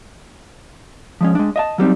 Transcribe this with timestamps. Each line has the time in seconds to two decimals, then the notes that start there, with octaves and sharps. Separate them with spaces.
1.21 F3 G#3 C#4
1.35 G#3 D4
1.56 D#5 E5 A5
1.78 F#3 G3 C4 D#4